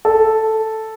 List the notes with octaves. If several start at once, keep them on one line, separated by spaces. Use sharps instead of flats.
A4